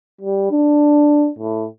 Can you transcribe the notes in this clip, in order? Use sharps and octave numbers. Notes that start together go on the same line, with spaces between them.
G3
D4
A2